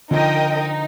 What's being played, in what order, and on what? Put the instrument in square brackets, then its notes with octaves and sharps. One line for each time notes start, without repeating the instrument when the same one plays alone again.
[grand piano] D3 F3 [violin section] D#4 A#4 D#5 G5
[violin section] D#4